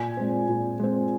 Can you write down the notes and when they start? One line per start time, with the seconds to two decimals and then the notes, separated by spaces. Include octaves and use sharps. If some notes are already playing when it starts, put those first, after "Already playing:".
Already playing: A#2 G#5
0.17 G#3 C4
0.49 A#2
0.80 G#3 C4